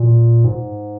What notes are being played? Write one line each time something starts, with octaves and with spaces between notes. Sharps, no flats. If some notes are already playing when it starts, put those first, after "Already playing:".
Already playing: A#2
G#2